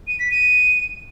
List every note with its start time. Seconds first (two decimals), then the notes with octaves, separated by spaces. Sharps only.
0.08 D#7
0.19 B6
0.31 D#7